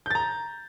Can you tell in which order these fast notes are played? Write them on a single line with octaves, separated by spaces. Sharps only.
G6 A6 A#5